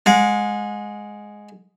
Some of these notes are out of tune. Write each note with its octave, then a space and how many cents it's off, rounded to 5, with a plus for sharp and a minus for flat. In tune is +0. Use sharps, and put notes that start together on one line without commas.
G#3 +0 F#5 -40